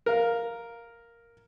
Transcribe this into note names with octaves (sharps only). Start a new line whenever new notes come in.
A#4 F5